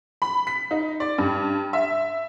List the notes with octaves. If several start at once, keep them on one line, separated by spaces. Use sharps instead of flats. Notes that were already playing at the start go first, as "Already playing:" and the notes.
B5
B6
D#4
D5
G2
E5